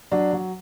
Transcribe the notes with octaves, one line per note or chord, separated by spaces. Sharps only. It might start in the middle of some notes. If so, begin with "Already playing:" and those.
F#3 D4
F#3